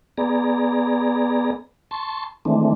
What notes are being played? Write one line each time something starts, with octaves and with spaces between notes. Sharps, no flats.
B3 G#4 D5 A#5
A5 C6 C#6
D#3 E3 G#3 A3 C4 D4